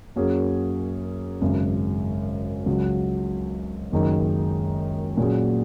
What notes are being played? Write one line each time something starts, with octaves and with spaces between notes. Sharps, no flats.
F#2 F#3 A#3 C#4 G#4
G#1 F#2 C#3
C#2 C#3 F#3
F#1 F#2 D#3 G#3 D#4
A#2 F#3 C#4 G#4